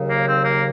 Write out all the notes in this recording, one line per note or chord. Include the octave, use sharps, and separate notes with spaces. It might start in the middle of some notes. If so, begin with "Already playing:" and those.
Already playing: D#2 C#3 F#3
A#3
C4
A#3